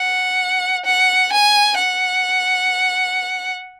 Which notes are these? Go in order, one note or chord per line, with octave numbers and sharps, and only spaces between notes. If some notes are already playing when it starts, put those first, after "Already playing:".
Already playing: F#5
F#5
G#5
F#5